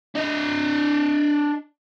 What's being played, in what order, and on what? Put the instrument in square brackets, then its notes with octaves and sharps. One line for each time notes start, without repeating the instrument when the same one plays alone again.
[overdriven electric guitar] D4 D#5